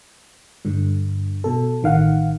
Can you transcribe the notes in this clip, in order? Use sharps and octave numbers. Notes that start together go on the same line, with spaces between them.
G2 D3
B2 A4
A1 D#3 F5 F#5